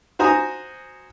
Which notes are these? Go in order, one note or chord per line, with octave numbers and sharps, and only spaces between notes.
F#4 C5 G#5 A#5 D#6